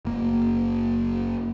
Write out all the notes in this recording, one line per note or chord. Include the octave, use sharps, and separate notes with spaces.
F#1 A#3